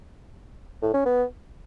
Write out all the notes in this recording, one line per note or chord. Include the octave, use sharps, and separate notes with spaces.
A2
C#4
B3